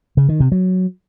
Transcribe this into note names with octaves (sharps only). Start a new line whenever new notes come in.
C#3
D#3
C3
F#3